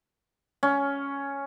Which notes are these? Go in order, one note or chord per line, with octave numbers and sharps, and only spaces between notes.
C#4